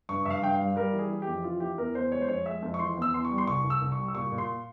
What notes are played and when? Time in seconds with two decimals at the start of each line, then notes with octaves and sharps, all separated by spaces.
0.09 G2 C#6
0.25 G2 E5 F5
0.42 G2 G5
0.54 F5
0.60 G3
0.76 G3 A#4
0.93 E3
0.99 G#4
1.10 E3
1.22 F2 G4
1.44 E3 F4
1.60 E3 G4
1.78 E2 A#4
1.95 E2 C5
2.12 G#3 C#5
2.22 C5
2.28 F2 C#5
2.46 G#3 E5
2.62 F2
2.74 C#6
2.79 E3 C6
2.97 E2
3.02 E6
3.14 E2 C6
3.25 C#6
3.30 G3
3.38 C6
3.47 C2 C#6
3.64 C2
3.70 E6
3.82 C2
3.92 C#6
3.99 G3
4.08 E6
4.15 A#2 C#6
4.32 A#2
4.38 C6